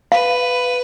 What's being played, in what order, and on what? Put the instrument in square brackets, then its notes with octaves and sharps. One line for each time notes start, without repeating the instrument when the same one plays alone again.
[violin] B4 [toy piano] F5